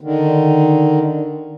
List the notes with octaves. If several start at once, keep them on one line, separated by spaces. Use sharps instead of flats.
D3 D#3